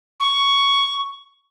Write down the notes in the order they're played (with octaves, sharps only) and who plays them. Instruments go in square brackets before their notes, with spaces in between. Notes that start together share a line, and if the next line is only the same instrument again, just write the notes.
[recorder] C#6